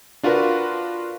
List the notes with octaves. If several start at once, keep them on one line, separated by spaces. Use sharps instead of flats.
D4 F4 F#4 A#4 B4